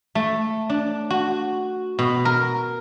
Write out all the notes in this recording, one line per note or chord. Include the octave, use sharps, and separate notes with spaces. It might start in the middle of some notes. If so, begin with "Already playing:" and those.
A3
D4
F#4
B2
A#4